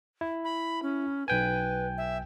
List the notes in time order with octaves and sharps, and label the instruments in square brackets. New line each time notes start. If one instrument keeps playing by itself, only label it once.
[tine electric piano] E4
[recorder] B5
C#4
[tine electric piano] B1 G5 G#5 [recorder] B4
[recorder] E5